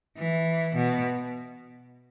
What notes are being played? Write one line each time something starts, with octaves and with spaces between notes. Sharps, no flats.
E3
B2